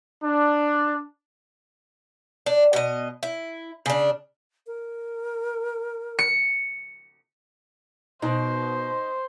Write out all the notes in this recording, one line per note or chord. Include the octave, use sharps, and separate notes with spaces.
D4
D4
B2 D#5
E4
C#3 D4
A#4
C#7
B2 D#4 C5